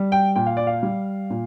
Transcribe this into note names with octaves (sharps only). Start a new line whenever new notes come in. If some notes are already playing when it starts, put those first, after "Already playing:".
Already playing: G3
G5
A#2 G5
F5
D5
F5
G3
A#2